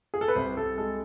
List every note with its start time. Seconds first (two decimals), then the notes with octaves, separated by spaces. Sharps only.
0.14 G#4
0.21 A4
0.28 B4
0.35 C2 C5
0.57 C2 A4
0.78 G#3 A4